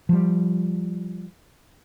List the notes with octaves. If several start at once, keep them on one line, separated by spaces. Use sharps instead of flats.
F3 G3